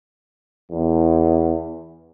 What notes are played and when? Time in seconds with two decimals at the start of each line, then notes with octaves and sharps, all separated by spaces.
0.71 E2